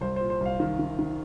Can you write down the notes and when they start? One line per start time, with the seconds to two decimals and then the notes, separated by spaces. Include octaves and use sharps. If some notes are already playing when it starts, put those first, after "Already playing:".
0.01 C2 C5
0.16 A#2 C5
0.30 C5
0.40 C2
0.46 F5
0.60 D#3
0.79 D#3
0.99 D#3